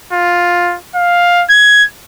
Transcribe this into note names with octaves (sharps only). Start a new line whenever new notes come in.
F4
F5
G#6